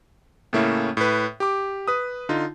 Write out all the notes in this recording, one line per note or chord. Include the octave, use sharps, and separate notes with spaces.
A2 C#3 A3 A#3 C#4 E4
A2 B4
G4 D6
B4 D#6
D3 D#4 F4